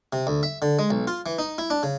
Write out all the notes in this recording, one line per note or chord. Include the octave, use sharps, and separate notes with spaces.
C3
D2
E5
D3
G#3
B1
F4
E3
D#4
E4
D4
C#3